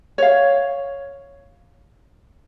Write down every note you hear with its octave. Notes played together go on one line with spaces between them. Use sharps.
C#5 F5